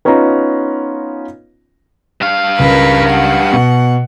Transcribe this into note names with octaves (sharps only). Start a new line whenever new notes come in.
B3 C#4 D#4 F4 A#5
G2 F5
C#2 A#4 B4
F#5
B2